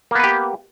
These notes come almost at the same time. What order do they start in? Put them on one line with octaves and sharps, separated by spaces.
A#3 B3 B4 G4